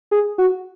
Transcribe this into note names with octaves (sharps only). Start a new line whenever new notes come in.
G#4
F#4